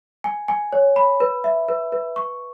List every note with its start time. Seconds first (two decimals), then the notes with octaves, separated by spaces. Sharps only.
0.24 G#5
0.48 G#5
0.73 C#5
0.96 B5
1.20 B4
1.44 E5
1.68 B4
1.92 B4
2.16 C#6